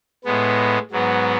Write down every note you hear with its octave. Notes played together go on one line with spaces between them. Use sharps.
A2 G#3 B3
G#2 F#3 B3